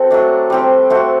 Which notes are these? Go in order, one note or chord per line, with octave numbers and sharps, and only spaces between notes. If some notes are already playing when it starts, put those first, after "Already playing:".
Already playing: C4 F#4 A4
F#3 A3 D4
G3 C4 G4
A3 C4 F#4